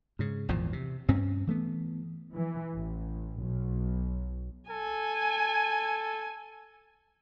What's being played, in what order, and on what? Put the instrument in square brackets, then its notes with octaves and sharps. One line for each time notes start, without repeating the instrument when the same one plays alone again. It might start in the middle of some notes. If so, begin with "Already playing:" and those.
[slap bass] G#2 C#3
G#1 E2 A#2 F3
C3
G2 C4 C#4
E3 A3 B3
[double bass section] E3
A1
B1
[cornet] A4 [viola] G#5